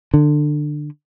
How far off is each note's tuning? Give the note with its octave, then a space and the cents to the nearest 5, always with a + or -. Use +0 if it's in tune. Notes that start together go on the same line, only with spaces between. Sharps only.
D3 +20